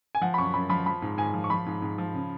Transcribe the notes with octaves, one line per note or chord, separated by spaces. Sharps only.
G#5
F3 F#5
B5
F#2 C#6
F#2 B5
F3 B5
F3 B5
G#2
G#2 G#5
F3
C#6
F3 B5
G#2
G#2
F3
C#3